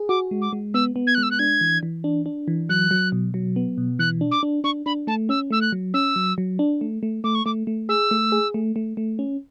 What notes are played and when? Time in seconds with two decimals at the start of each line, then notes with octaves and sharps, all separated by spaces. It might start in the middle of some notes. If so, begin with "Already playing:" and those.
Already playing: G#4
0.09 F#4 D6
0.31 G#3
0.42 D6
0.53 G#3
0.74 B3 E6
0.96 B3
1.07 G#6
1.15 G#3 F#6
1.23 E6
1.31 F#6
1.39 D4 G#6
1.61 E3
1.83 E3
2.04 D4
2.26 D4
2.48 E3
2.69 F#3 F#6
2.91 F#3
3.12 B2
3.34 F#3
3.56 B3
3.78 B2
3.99 E3 F#6
4.21 D4
4.31 D6
4.43 D4
4.64 D4 C#6
4.86 D4 B5
5.07 A3 A5
5.29 C#4 E6
5.51 A3 E6
5.61 F#6
5.72 F#3
5.94 C#4 E6
6.16 F#3
6.38 F#3
6.59 D4
6.81 A3
7.03 A3
7.24 A3 D6
7.35 C#6
7.46 A3 D6
7.67 A3
7.89 G#4 E6
8.11 A3
8.32 G#4
8.54 A3
8.76 A3
8.97 A3
9.19 C#4